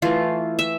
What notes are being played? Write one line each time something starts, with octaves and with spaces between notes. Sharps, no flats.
E3 A3 F4
E5